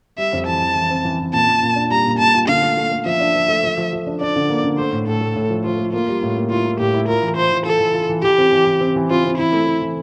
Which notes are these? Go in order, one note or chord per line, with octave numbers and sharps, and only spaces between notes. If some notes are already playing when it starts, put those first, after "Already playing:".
G3 E5
F2
E3 A5
E3
E3
C4
E3
E3
A#2 A5
A#2
A#2
D4
G3 A#5
A#2
A#2 A5
F4
D3 F5
A3
A3
A3
F3 E5
D4
F3
A3
F3
F3
F3
D4
D4 D5
D3
A#3
D3
A3 C5
A2
A2 A4
A3
A2
F3
F3 F4
A3
A#3 F4
G3
A2
A#3
E4 F4
E4
A2 G4
E4
F4 A#4
E3
F4 C5
E3
F4 A4
E3
F4
E3
E3 G4
C4
E3
E3
C4
E3
C4 F4
C4
E3 E4
A3
A3
E3